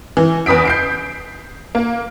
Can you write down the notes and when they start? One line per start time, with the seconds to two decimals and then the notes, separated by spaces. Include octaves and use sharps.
0.17 E3
0.46 E2 B4 D#6 B6 D7
0.65 G6 C7 D7
1.75 A#3